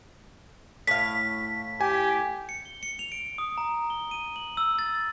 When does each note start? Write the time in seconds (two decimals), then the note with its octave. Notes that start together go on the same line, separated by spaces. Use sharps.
0.87 A2 F5 B6
1.81 G4 G#5
2.49 C#7
2.65 G7
2.83 C#7
2.99 F7
3.12 D7
3.38 D#6
3.58 A#5
3.90 G7
4.11 D#7
4.36 F#7
4.57 E6
4.79 A6